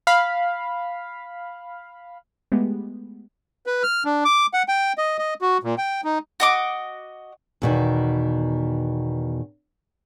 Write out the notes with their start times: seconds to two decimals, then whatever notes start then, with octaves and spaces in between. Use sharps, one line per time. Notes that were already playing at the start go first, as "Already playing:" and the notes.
0.07 F5 B5
2.52 G#3 A3 B3 G4
3.66 B4
3.83 F6
4.05 D4
4.25 D6
4.54 F#5
4.68 G5
4.98 D#5
5.19 D#5
5.41 F#4
5.63 A#2
5.78 G5
6.04 D#4
6.40 F#4 D#5 D6
7.62 E2 B2 D#3